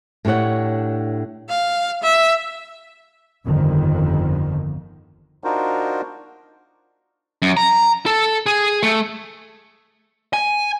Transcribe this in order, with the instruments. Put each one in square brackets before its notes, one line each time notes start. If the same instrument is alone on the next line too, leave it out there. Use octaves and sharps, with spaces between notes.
[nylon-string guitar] A2 D4 G4 C#5 F#5
[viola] F5
E5
[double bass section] G1 F2 D3 D#3
[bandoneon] D4 D#4 F4 F#4 A#4 C5
[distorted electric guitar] F#2
A#5
A4
G#4
A3
[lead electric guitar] G#5